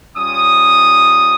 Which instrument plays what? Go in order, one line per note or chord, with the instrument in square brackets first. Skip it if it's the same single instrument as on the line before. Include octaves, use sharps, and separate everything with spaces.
[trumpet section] G3 C#4 F4 D#6